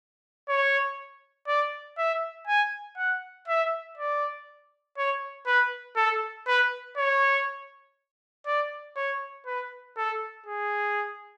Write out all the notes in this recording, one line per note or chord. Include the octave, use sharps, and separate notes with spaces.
C#5
D5
E5
G#5
F#5
E5
D5
C#5
B4
A4
B4
C#5
D5
C#5
B4
A4
G#4